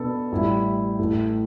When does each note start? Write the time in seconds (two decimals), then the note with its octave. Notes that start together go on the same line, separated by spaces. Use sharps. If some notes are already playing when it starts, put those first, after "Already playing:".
Already playing: B2 B3 D4 A4
0.32 A1 A2 G3 E4
0.99 A1 A2 A3